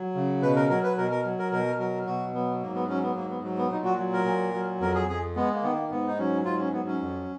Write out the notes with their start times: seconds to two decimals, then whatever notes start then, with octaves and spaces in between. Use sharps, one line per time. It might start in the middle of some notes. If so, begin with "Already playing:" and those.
Already playing: F#3
0.15 C#3
0.42 B2 B4
0.56 A#4
0.70 F#3 A#4
0.83 B4
0.97 B2 A#4
1.11 A#4
1.25 F#3
1.39 A#4
1.52 B2 A#4
1.79 F#3 A#4
2.06 B2 F#4
2.34 F#3 B3
2.62 G#2 A#3
2.75 B3
2.89 F#3 C#4
3.02 B3
3.16 G#2 A#3
3.30 B3
3.44 F#3
3.57 B3
3.72 A#2 D#4
3.85 F#4
3.99 F#3
4.13 A#4
4.26 A#2
4.54 F#3
4.81 F2 A#4
4.95 G#4
5.09 F2 G#4
5.36 G#3 B3
5.55 A#3
5.63 D#3 B3
5.72 A#3
5.91 G#2 B3
6.07 D#4
6.18 F#3 C#4
6.45 G#2 F4
6.59 C#4
6.73 F#3 B3
6.87 C#4
7.01 F2